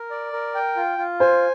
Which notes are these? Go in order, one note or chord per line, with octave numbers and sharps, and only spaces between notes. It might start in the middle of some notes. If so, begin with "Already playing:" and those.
Already playing: A#4
D5
A#4
G5
F4
F4
C5 G#5